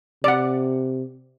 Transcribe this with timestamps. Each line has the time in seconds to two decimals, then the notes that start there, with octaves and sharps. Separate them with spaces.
0.24 C3 D5 F#5